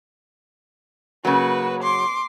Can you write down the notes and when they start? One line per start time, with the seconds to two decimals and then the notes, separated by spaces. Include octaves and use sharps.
1.25 C#3 F#3 A#3 F#4 B4
1.82 C6 D6